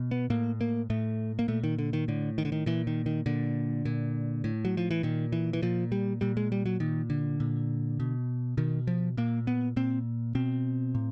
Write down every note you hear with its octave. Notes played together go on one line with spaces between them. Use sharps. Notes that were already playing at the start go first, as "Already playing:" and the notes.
Already playing: B2
B3
A2 A#3
A#3
A2 A3
A#3
A#2 A3
D#3
D3
D#3
A2 D3
D#3
D3
D#3
A#2 E3
D#3
D#3
A#2 D3
A#2
A2
F#3
F3
E3
A#2 D#3
E3
E3
A#2 F3
G3
A#2 G3
G#3
G3
F#3
A#2 D#3
D3
A#2
B2
B2 D#3
F3
A#2 A#3
B3
A#2 C4
B2 C4
A2